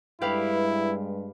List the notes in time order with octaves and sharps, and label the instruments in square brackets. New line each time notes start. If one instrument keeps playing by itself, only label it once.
[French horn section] G2 G3 G#3 [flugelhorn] E4 [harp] G4 B4 F5